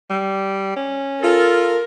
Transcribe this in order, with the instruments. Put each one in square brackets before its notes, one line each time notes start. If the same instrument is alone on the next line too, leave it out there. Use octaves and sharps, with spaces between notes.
[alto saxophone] G3
C#4
[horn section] F4 A4 [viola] A#4